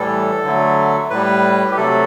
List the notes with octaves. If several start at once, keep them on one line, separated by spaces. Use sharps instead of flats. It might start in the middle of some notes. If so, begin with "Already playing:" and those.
Already playing: A2 E3 G3 A4
D3 F#3 A3
A2 G3 B4
G4
C3 F#3 A3 A4